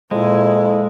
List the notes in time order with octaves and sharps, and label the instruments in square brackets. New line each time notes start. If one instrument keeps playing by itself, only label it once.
[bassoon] F2 [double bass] A#2 E4 [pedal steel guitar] G#3